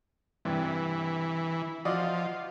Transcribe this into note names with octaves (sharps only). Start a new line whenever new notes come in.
G2 C3 E3
F3 F#4 D5 D#5